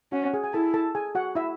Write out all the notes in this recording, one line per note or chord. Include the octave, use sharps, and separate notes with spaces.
C#4 F#4 F#5
F#5
G#4 G#5
G#5
E4 A4 A5
A4 A5
G#4 G#5
F#4 F#5
E4 E5